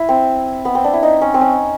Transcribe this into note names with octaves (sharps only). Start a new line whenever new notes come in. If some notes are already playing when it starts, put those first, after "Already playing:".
Already playing: E4
C4
B3
C4
D4
E4
D#4
C#4
C4
C#4